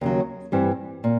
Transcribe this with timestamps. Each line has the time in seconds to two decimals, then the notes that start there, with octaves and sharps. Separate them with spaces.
0.01 D#2 C#3 F#3
0.52 G2 E3 G3 C4
1.04 A#2